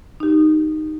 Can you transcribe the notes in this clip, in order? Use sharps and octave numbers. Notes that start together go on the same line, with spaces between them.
D#4 G4